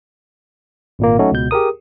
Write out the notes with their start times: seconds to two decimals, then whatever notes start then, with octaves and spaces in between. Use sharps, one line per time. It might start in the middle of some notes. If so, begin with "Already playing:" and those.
0.99 G#1 A#2 A#3
1.19 F#3 A3 C#4 D#4 F#4 A4
1.32 C#2 B2 G6
1.51 G4 G#4 A#4 D#6